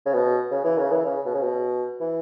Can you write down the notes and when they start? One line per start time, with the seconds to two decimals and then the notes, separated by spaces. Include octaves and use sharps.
0.06 C#3
0.14 B2
0.51 C#3
0.64 E3
0.78 C#3
0.91 E3
1.06 C#3
1.26 B2
1.34 C#3
1.43 B2
2.01 E3